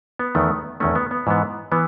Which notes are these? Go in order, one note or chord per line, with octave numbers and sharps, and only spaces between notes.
B3
E2 D#3 A3
E2 D#3 A3 C#4
B3
B3
G#2 E3 B3
E3 B3